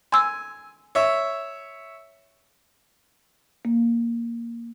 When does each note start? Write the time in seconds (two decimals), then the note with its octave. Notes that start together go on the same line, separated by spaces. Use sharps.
0.12 G#5 C6 E6
0.95 C#5 E5
3.65 A#3